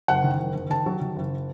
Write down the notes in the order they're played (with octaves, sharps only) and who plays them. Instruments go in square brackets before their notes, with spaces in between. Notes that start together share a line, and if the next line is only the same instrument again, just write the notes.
[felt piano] F#1 F#5
D#3
F#1
D#3
D#3 A5
F#3
D#3
F#1